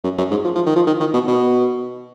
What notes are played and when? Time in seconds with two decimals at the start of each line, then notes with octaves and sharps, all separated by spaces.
0.04 F#2
0.18 F#2
0.31 G#2
0.45 F3
0.55 F3
0.66 D#3
0.76 F3
0.87 D#3
1.00 D#3
1.14 B2
1.28 B2